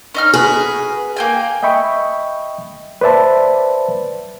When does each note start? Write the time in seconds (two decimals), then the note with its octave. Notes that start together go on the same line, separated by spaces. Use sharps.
0.15 C#4 D#4 F6
0.34 F#4 G#4 B4 B5
1.17 A#3 G5 G#5
1.63 D#5 E5 G5 B5 C#6
3.01 B4 C5 D5 E5 A5 B5